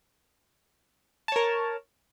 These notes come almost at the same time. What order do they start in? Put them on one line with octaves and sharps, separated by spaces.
A5 C#5 A#4